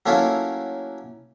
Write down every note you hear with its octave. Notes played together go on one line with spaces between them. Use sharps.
F#3 A3 A#3 C#4 E4 F4